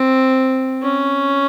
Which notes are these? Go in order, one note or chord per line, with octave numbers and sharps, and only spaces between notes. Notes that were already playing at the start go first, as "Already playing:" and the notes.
Already playing: C4
C#4